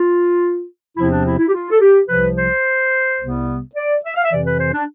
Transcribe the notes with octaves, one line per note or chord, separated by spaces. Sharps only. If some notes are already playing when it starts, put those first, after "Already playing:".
Already playing: F4
E2 C3 F3 C4 E4
D4
E4
E4
G4
F4
A4
G4
C2 C3 F3 B4
C5
C2 C3 G3 B3
D5
E5
F5
E5
F2 C3 E3 D5
B4
C5
D4